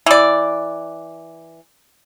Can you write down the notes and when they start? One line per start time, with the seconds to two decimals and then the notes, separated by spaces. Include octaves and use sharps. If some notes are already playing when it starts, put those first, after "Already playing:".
0.06 E3 D5